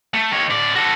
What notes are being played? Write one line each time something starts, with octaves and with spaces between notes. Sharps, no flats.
A3
D#3 C#5
A2 D5
F#4 A4